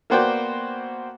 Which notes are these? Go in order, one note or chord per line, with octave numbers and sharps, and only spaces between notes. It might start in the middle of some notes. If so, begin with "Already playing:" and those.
A#3 B3 F#4 C5 D5 G5